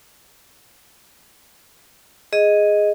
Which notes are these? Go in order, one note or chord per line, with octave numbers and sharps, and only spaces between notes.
G#4 D#5